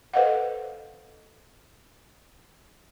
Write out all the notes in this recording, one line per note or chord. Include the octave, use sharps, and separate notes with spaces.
A4 B4 C5 D#5 F5 F#5